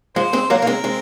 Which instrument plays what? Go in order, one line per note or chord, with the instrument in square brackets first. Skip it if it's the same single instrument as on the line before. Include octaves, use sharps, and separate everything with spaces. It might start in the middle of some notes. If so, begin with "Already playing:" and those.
[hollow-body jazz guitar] F3 G#3 [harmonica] C5
[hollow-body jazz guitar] G#3 C4
[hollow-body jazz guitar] F#3 A#3 [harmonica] A#4
[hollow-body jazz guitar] A#3
G#3 C4
G#3 C4